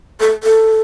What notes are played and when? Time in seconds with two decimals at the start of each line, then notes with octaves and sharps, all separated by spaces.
0.20 A4
0.43 A4